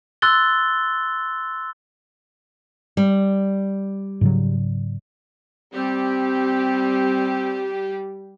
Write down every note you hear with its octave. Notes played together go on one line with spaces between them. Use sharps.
C6 E6 F#6 A6 G7
G3
G#2 C#3 F#3
G3 C4 G4